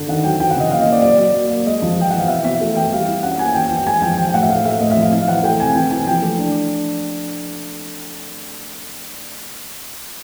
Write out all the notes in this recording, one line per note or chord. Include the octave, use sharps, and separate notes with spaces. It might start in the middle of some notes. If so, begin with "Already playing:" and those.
Already playing: D3
D#3 F#5
F#3 G5
E3 G5
F#5
C#3 D#5
A#2 F5
A#3 D#5
D5
F#3 D5
F#3
A#3
A#3
G#3 D#5
F3
E3 G5
E3 F#5
F5
B2 E5
B2 E5
A3
E3 G5
G3 F5
E4
C#4 F#5
A#3 G#5
E3 G5
G5
E3
G5
G#3 G#5
F3 G5
E3 G5
G5
A2 F#5
E5
A3 F5
A3 E5
A2 D#5
E5
F3
F5
E4 F5
E3 F#5
A3 G5
C3 G#5
E3 G5
E3 G#5
F3 G5
A3
D4